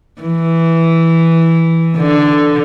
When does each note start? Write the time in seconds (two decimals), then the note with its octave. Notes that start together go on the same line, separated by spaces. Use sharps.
0.22 E3
1.97 D3